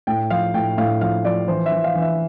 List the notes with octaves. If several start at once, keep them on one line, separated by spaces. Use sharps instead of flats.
A2 G5
F3 F5
A2 G5
A2 F5
F3 F5
F3 D5
E3 C5
E5
E3
F5
E3
E5